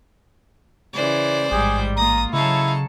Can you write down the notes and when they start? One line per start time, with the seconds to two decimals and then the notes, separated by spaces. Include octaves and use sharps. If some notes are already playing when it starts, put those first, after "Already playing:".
0.93 C#3 E3 C5 D5
1.51 A1 G#2 G3 G#4 G6
1.97 A#3 F4 A#5 D#6
2.33 C#3 F#3 D#4 E4 A4 F5 C#6